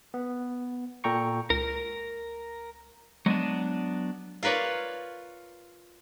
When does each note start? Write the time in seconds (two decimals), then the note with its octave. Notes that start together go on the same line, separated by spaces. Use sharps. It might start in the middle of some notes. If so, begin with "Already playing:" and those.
0.14 B3
1.04 A#2 A4 G5 A#5 C#6 C#7
1.50 C#2 A#4
3.26 F#3 G#3 B3 D4
4.43 F4 A#4 B4 C#5 D5